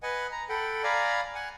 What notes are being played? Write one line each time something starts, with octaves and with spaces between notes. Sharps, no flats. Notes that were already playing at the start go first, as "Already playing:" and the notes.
B4 D#5 F#5 G#5
A#5
A4 F#5 G5 B5
D5 F5 G#5 A#5 B5
F#5 G#5